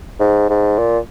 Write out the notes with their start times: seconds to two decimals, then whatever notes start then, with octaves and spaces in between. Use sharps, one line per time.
0.20 G#2
0.50 G#2
0.79 A#2